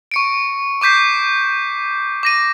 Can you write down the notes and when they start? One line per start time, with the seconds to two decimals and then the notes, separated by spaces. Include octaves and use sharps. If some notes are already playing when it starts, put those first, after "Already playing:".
0.11 C#6 C#7 D7
0.81 C#6 D6 G6 B6 C7
2.23 D6 A#6 D#7